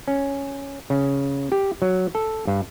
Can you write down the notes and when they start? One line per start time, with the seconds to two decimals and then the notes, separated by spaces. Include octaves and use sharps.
0.08 C#4
0.90 C#3
1.52 G4
1.82 F#3
2.15 A4
2.47 G2